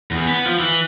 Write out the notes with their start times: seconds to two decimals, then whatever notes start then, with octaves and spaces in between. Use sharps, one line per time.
0.11 E2
0.28 B3
0.45 F3
0.60 E3